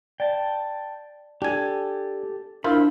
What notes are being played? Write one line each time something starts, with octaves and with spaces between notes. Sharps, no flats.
D5 G5 A5 A6
D4 G4 A4 G#5
D4 E4 F4 A#4 C5 B5 E6